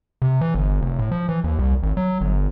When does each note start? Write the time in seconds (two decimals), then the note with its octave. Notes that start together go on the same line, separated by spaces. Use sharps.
0.22 C3
0.41 E3
0.55 G1
0.82 F1
0.99 A2
1.12 F3
1.29 E3
1.44 D#2
1.59 C2
1.83 G#1
1.97 F#3
2.21 G1